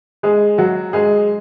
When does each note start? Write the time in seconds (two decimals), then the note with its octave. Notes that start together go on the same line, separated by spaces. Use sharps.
0.23 G#3 G#4
0.58 F#3 F#4
0.93 G#3 G#4